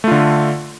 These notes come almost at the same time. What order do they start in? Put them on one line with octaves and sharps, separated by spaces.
A3 F4 D3